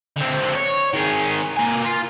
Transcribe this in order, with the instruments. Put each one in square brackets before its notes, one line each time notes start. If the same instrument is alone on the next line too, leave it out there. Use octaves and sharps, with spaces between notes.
[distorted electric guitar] D3 C4
C#5
D#3 G#4
A#3 G#5
F4